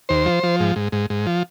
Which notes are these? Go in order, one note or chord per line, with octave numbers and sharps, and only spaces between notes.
D#2 C5
F3
F3
G#2
G#2
G#2
G#2
F3